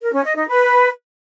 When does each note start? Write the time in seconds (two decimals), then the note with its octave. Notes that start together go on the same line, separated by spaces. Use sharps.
0.01 A#4
0.13 C#4
0.24 D#5
0.36 D#4
0.48 B4